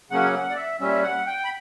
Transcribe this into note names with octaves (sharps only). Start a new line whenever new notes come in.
C#3 F#3 A#3 C#4 F#5
F#5
D5
E5
A#2 G3 C#4 E5
F#5
G5
B5